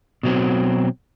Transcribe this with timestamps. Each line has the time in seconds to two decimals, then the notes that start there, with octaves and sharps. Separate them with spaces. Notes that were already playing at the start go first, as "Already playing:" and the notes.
0.23 B2 F#3 C4